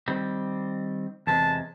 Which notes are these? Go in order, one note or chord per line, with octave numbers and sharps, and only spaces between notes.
D#3 G3 C4
E2 C3 G#3 A5